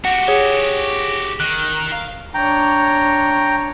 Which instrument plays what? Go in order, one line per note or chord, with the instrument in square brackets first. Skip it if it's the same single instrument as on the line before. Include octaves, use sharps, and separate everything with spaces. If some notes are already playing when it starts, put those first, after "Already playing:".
[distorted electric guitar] F#4 G4 [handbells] F#5
[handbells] G#4 C#5
[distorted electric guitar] D#3 [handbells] F#6
[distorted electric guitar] F5
[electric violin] D4 C#5 [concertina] G5 A#5